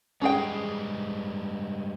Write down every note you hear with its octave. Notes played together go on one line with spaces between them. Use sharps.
G2 G#3 C#4 G#4 G5